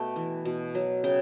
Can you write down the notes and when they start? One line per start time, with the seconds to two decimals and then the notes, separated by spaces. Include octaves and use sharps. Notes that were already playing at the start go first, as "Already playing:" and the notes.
Already playing: B2 A3 G5
0.16 E3
0.45 B2
0.75 F#3
1.04 C#3 G5